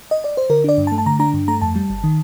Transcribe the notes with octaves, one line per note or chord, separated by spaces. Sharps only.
D#5
D5
C5
D3 A#4
D4 D5
G2
A5
A3
A5
D3 A#5
D4 A#5
G2
A3 A#5
F2 A5
G3
G1
D#3